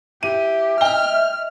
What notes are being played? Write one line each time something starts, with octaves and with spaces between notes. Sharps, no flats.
E4 G4 D#7
D#5 E5 G5 F6 G7